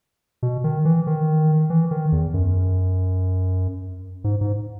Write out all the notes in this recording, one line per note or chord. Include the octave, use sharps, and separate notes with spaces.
B2
D#3
E3
D#3
E3
D#3
E2
F#2
G#2
G#2